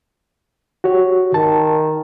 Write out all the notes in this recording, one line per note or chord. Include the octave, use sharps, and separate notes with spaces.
F#4 G4 C#5
D#3 A5